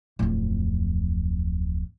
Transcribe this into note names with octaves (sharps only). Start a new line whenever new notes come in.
D1 F2